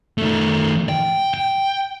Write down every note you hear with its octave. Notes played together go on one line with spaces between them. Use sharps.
D#3 A3
G5
G5